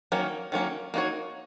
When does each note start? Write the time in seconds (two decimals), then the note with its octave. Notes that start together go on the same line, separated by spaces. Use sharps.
0.12 D#3 F#3 A#3 C#4
0.52 D#3 F#3 A#3 C#4
0.94 A#3 D#4 F#4 C#5